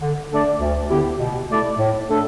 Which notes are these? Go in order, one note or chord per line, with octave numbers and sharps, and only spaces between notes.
D3
A3 D4 A4 D5
D2
D3 B3 E4 G4
B2
A3 E4 A4 D5
A2
A3 D4 A4